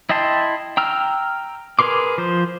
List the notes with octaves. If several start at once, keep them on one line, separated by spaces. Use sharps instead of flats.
E4 D#5 G5 A5 C6
G5 A#5 E6 F6
G#4 A#4 B4 C6 D6
F3 C5